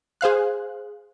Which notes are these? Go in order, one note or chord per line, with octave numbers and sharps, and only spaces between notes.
G#4 C5 F5 F#6